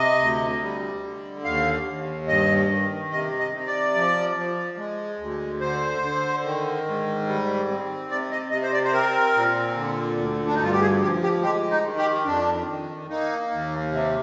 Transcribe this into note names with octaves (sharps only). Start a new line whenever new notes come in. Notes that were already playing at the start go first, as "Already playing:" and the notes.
Already playing: C3 D#5
D2
G3
D3
D#2 F5
D#2
G2 D#5
D#3
C3 D#5
D#5
C3
D5
F3
F3
G#3
D2
D3 C5
D3
D#3
G#2
G3
C4
C3 D5
D#5
C3 D#5
C5
D5
C5
C4 A#4
A#2
D3
D2
D4
D#4
G2 F4
G4
G#4
F3 G4
G4
G#3 G4
D#4
D#3
G4
F2 D4
D#3
A#3 D#4
D#2
C3